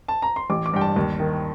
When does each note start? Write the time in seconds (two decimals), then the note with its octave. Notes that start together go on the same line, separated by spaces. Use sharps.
0.08 A5
0.22 A#5
0.36 C6
0.50 A1 D6
0.66 D6
0.74 G2 G5
0.81 A5
0.96 D#2
1.20 D#3